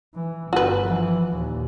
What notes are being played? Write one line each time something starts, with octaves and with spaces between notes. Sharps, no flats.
E3
G1 F#4 B4
E3 F3
D#2 A#2